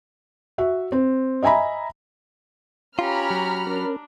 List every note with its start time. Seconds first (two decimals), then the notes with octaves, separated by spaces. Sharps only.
0.58 F#4 E5
0.92 C4
1.43 D#5 E5 G#5 A#5 B5
2.99 C#4 F4 G4 C#5 A#5 B5 F6
3.30 F#3
3.66 C#4 D4 A#4